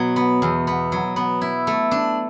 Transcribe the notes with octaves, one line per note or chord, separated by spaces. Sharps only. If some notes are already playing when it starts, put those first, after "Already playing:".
Already playing: B2 F#3
B3
E2
B3
F#3
B3
E4
A3
D4